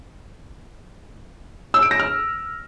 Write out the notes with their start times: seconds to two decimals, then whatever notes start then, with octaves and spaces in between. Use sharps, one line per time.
1.74 E6
1.83 D7
1.91 A#6
1.99 F6